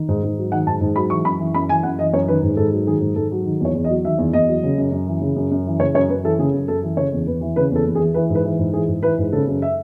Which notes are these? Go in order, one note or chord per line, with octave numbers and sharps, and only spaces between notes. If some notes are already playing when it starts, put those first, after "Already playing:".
Already playing: D#3
G#2
G#2
F#3
D#3 F#5
G#2 A5
G#2
F#3 B5
E3 C#6
F#2 B5
E3
F#2 B5
E3 G#5
F#2 F#5
E3 D#5
F#2 C#5
D#3 B4
G#2
G#2 A4
F#3
D#3 G#4
G#2
G#2 A4
F#3
D#3
E2 C#5
E2
D#5
F#3
D#3 E5
E2
E2 D#5
F#3
C#3
F#2
F#2
E3
C#3
F#2
F#2
E3
C#3 C#5
F#2 C#5
F#2 B4
E3 A4
C#3 G#4
F#2
F#2 A4
E3
C#3 C#5
E2
E2 B4
E3
C#3 B4
E2 A4
E2
G#4
E3
E3 B4
G#2
B4
E3
G#2
E3 G#4
G#2
E3 B4
G#2
C#3 A4
F#2
E5